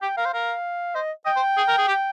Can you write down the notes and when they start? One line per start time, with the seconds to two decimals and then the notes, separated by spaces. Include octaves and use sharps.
0.02 G4 G5
0.17 A#4 F5
0.26 C5
0.33 A#4 F5
0.95 C5 D#5
1.26 D#5 G5
1.37 C5
1.58 G#4
1.69 A#4
1.79 G#4
1.88 G4